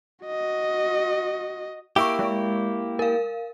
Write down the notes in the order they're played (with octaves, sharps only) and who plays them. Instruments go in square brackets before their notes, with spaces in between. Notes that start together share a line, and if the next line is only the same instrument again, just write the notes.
[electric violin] F#4 D#5
[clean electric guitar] A#3 E4 G4 [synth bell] C#6 E6 D7
[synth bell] G#3
A#4 F5